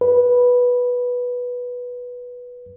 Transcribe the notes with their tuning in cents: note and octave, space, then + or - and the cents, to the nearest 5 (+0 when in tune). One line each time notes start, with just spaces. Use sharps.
B4 -10